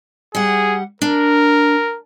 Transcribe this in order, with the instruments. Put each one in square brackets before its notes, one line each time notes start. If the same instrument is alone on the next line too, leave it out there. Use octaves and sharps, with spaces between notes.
[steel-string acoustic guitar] G3 F#5 [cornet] G#4
[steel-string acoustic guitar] D4 [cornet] A#4